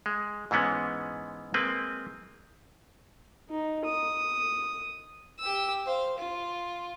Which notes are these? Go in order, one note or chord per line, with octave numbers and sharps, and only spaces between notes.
G#3
G#2 E3 G#3 B3 C#4
G#3 A#3 C4 B4
D#4
D#6
G4 E6
C5 F5
F4